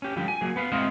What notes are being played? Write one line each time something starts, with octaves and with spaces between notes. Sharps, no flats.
C#4 G4
D3 F3 G3 G4
G#5
F#3 A#3 G#4
B3 B4 F5
G#3 C4 E4 C5 D#5 F5